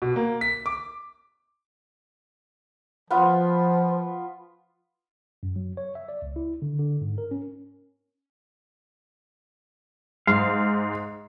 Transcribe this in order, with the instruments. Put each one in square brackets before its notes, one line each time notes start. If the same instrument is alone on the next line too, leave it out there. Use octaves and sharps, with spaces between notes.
[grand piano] B2
A#3
B6
D6
[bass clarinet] F3 [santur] B3 F4
[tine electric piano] F#2
F#3
C#5
E5
D5
C#2
E4
D3
D3
G#2
A#4
C#4
[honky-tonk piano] G#2 [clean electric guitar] F5